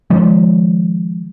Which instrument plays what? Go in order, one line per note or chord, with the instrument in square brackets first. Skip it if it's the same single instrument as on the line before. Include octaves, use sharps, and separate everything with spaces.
[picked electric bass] D#3 F3 G#3